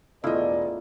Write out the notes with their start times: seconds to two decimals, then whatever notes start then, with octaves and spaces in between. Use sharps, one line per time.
0.24 E1 A2 B3 E4 F4 A4 D5 D#5